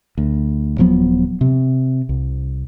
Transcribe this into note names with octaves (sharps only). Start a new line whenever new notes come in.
D2
D#1 F3 F#3 B3
C3
C2